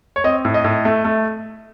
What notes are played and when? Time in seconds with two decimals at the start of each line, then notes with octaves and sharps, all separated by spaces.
0.16 C#5
0.24 C4 D#5
0.45 A2
0.54 D#5
0.64 A2
0.85 A3
1.05 A3